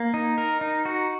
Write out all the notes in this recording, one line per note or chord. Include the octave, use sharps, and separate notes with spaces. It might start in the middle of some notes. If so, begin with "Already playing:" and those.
Already playing: A#3
D#4
A#4
D#4
F#4